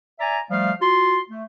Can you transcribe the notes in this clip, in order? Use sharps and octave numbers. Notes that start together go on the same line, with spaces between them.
D5 E5 G#5 A#5
F3 G3 A3 F5
F4 F#4 C6
A3